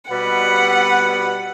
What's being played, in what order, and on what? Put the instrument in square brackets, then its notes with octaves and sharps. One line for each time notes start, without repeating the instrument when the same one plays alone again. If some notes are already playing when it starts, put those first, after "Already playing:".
[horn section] B2 G3 B4 [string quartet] F#5